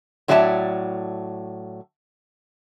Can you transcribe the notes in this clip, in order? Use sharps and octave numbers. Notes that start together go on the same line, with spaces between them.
A2 F#3 D5 E5 G#5 A5